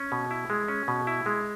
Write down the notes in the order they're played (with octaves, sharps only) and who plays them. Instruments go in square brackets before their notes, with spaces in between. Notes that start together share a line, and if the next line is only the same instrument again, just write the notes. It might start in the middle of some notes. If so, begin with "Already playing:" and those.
Already playing: [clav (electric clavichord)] C#4
B2
E4
G#3
C#4
B2
E4
G#3